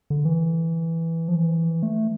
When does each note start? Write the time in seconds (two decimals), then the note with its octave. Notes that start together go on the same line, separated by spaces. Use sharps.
0.10 D3
0.25 E3
1.28 F3
1.35 E3
1.83 A3